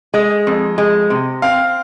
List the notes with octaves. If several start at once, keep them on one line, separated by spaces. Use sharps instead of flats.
G#3 D#5
F2
G#3
C3
C4 F5